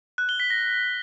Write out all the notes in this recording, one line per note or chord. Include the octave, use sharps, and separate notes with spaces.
F#6
G7
B6
A#6